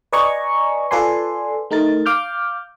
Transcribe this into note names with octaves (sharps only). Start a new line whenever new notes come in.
B4 D5 D#5 G#5 A#5 C#6
F4 A4 B4 D5 G#5 C6
A3 D#4 A#4 A6
F5 D6 F6 G6